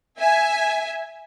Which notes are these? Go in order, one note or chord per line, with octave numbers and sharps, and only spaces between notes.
E5 G#5